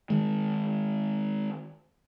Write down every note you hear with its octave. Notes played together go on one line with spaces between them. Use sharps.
D#3 G#3